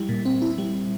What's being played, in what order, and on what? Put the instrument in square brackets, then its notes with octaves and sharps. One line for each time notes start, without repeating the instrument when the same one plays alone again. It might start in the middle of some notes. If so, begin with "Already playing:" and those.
Already playing: [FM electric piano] G3 E4
A#2
C4
E4
G3